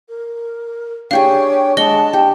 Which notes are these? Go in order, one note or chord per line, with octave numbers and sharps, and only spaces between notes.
A#4
D4 G4 G#4 C#5 F5 G5
G#3 D4 D#5 F#5 A5 G7
G4 G5